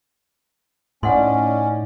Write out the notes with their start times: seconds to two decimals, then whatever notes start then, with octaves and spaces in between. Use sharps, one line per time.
1.03 A2 C#4 D#4 D5 F#5 C6